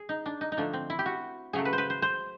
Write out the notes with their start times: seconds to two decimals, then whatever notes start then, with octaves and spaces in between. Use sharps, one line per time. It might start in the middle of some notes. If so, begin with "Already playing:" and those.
Already playing: G#4
0.09 D#4
0.26 D4
0.41 D#4
0.52 D#4
0.57 D3 F3 A3 D4
0.73 C4
0.90 E4
0.99 G4
1.06 F#4
1.53 C#3 F#3 A3 G#4
1.65 B4
1.73 C5
1.78 B4
1.90 C5
2.02 C5